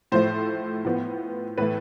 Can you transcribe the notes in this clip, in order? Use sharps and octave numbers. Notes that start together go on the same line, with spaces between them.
A2 F3 A3 C5
A2 F3 B3
A2 E3 A3 B4